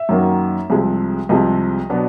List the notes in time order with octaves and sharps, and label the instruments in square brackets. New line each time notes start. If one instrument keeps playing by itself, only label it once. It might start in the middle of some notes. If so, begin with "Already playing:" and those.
Already playing: [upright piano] E5
F#2 D#3 F#3 A#3
C2 C3 F3 G#3
C2 C3 F3 G#3 D#5
B2 F#3 B3 D4